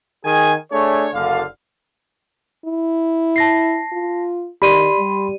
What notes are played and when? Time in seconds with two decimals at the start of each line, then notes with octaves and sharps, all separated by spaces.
0.24 D#3 G#4 G#5
0.71 A3 D4 G#4 C#5
1.12 F#1 D3 F5
2.65 E4
3.36 A5 A#6 C7
3.92 F4
4.62 D#3 G4 D5 B5 C6 D#7
4.98 G3